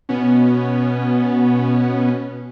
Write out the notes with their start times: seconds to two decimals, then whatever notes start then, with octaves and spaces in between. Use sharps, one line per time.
0.09 B2 B3 C#4